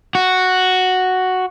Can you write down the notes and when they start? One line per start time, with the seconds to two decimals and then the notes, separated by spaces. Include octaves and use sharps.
0.15 F#4